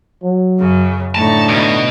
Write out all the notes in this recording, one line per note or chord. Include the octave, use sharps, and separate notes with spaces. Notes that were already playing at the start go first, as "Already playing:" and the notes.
F#3
F#2 C#3
A2 D3 D#4 A5 C#6
D2 B2